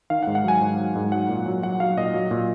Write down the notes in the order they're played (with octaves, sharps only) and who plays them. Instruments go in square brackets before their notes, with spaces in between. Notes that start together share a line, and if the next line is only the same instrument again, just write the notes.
[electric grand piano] D#3 F5
F#5
G#2
F#5
F#3 G#5
G#2
F#3
G#2
F#3 F#5
A#2
F#3
F#3 F#5
F#3 F5
A#2 D#5
F#3
A#2